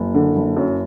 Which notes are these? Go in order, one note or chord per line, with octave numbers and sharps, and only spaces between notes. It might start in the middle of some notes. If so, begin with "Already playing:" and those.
Already playing: F#1
D3
F#1
F#2